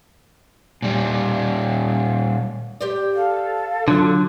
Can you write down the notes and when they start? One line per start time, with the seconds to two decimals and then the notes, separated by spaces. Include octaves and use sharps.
0.82 A#2 G3
2.81 G4 C5 D5
3.14 A4 F5
3.88 D3 F#3 F4